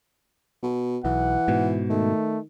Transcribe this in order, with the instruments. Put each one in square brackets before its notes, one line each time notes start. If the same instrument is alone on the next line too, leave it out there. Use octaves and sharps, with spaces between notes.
[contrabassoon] B2
[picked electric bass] B1 [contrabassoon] E3 [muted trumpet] F#5
[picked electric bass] G#2 B2
[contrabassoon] D#3 [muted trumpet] A3